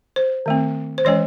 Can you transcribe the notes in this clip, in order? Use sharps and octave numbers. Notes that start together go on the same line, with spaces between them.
C5
D#3 A3 C4
C5
E3 G#3 C#4 C#5